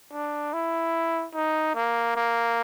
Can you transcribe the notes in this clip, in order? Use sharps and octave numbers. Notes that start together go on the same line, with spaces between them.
D4
E4
D#4
A#3
A#3